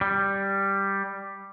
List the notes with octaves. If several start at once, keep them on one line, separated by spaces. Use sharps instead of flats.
G3